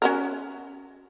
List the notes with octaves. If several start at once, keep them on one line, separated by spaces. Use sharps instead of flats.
C#4 F#4 A#4